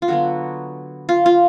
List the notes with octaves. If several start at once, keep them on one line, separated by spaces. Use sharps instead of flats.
F4
D3 F#3 B3 F#4
F4
F4